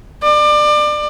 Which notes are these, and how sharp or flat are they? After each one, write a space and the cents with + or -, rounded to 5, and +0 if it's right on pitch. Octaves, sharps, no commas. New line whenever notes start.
D5 +25